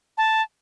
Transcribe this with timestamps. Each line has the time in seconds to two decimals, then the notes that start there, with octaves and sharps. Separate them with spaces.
0.18 A5